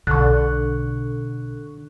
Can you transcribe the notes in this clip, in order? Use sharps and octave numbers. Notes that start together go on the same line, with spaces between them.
B1 B2 D3 C#6 F#6